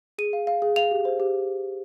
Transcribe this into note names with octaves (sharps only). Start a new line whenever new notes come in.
G#4 D#7
F5
F5
G#4
F5 F7
G4
C5
G4